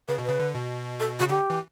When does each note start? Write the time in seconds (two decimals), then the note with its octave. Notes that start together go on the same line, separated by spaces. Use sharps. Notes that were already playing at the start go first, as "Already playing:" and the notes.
0.08 C#3 B4
0.18 B2
0.24 C#3 B4
0.39 D3
0.54 B2
1.00 A4
1.19 C#3 F#4
1.29 D3 G4
1.50 E3